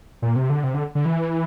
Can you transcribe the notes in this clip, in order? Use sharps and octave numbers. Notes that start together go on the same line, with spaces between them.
A#2
C3
D3
C3
D3
D3
E3